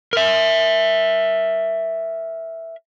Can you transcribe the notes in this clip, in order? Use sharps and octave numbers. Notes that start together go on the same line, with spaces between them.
A#4 E5